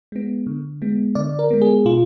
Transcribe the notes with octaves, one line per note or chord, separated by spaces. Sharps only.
G#3 B3
D3
G#3 B3
D3 D5
A#4
G#3 B3
G#4
B2 F4